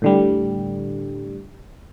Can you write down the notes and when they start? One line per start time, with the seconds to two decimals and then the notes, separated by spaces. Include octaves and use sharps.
0.02 A2 D3 G3